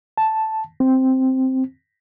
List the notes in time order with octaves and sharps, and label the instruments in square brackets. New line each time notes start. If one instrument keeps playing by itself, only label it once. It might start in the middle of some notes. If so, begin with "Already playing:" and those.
[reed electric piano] A5
C4